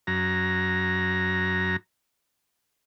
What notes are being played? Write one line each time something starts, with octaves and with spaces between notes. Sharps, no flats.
F#2 A#5